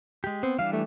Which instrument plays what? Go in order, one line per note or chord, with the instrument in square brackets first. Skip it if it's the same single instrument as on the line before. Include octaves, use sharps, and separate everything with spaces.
[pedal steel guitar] G#3 G4
[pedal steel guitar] B3 [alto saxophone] C4
[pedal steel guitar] E3 G3 D4 [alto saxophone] F5
[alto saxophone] A3